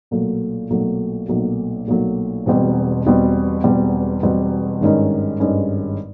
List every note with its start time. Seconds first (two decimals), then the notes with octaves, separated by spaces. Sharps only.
0.11 B1 A#2 F#3 A3
0.70 B1 A#2 F#3 A3
1.28 B1 A#2 F#3 A3
1.88 B1 A#2 F#3 A3
2.46 E1 E2 B2 G3 C4
3.05 E1 E2 B2 G3 C4
3.64 E1 E2 B2 G3 C4
4.22 E1 E2 B2 G3 C4
4.81 G#1 G2 D#3 G#3 C#4
5.40 G#1 G2 D#3 G#3 C#4